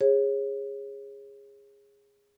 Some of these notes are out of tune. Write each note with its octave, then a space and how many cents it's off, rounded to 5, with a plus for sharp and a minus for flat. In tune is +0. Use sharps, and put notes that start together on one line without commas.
G#4 -20 C#5 -25